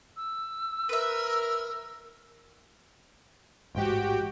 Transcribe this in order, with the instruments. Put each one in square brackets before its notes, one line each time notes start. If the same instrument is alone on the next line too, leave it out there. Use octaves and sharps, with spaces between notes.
[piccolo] E6
[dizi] A#4 [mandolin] B4 E5
[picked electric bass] A1 G#2 G#3 [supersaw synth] F#4 G4 G5